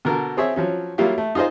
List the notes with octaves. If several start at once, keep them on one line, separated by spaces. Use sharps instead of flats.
B2 D3 A#4
C4 G#4 C#5 E5
F3 F#3 C#4
F#3 G3 A#3 E4 F4 G4
A3
D#4 F4 G#4 C5 D#5